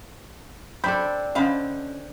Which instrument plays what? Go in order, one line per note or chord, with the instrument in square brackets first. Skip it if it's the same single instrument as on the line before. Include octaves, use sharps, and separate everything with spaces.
[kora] C4 D4 A4 [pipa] B5 [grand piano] G6
[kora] D3 C5 [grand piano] C#4 [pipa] D#5 F5 B5